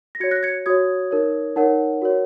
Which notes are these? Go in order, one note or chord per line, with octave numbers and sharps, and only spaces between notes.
A#6
F#4 C#5 G#6 C#7
F#6 A#6
G#6 C#7
F#4 C#5 D#6 G#6
D#4 A#4 C#5
D#4 A#4 C#5 F#5
F#4 A#4 C#5